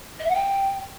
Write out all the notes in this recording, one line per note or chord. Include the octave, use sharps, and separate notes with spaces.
D#5
E5
F#5
G5